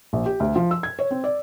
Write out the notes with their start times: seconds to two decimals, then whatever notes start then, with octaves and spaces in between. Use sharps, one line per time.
0.13 A#1
0.26 G4
0.40 D2
0.56 F3
0.71 E6
0.83 G#6
0.99 C#5
1.11 C4
1.24 D5